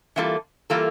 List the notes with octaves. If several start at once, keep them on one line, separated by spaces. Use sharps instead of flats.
E3 G3 A#3 F4 A4
E3 G3 A#3 F4 A4